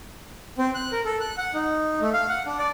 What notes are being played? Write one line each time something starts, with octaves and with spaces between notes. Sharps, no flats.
C4
F#6
A#4
A4
F#6
F#5
D#4
A3
F5
F#5
D4
D5